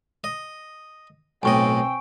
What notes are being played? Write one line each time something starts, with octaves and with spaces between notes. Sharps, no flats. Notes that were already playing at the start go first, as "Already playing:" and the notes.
D#5
B1 A2 C4 D#5 G5 G#5 C#6 D7